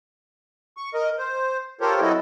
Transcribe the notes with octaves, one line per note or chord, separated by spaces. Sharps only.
C#6
A#4 D#5
C5
F4 G4 A4 A#4 C5 C#5
F#3 C4 E4 F#4 A4 D#5